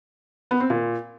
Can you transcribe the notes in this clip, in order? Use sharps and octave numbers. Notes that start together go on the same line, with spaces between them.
B3
C4
A#2